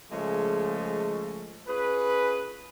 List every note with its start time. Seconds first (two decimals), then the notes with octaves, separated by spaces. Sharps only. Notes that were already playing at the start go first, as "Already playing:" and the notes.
0.11 C#3 F3 G#3 A3
1.67 C#4 F4 G#4 B4